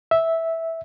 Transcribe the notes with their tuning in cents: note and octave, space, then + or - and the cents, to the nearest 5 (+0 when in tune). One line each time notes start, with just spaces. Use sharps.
E5 -10